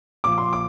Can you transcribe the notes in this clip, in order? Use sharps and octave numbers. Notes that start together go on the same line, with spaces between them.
A#2 F3 D6
C6
D6